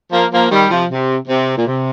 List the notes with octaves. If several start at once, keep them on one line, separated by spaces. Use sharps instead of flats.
F3 A#3
F3 A#3
D#3 G3
C3 F3
C3
C3
A#2
C3